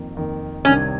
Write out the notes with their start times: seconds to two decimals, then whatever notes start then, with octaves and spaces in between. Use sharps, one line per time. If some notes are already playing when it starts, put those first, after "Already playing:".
Already playing: F2 D#3 A#3
0.15 F2 D#3 A#3
0.65 C2 C3 D#3 C#4